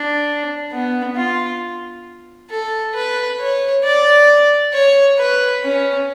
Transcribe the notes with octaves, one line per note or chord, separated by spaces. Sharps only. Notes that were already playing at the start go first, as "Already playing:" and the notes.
Already playing: D4
B3
F4
A4
B4
C#5
D5
C#5
B4
C#4